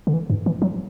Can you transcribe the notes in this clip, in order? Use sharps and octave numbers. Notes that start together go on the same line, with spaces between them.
D3
E3
G2
E3
F#3